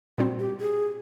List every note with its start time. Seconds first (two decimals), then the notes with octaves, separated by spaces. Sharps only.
0.18 A#2 G3 C4 F#4
0.39 G4
0.60 G#4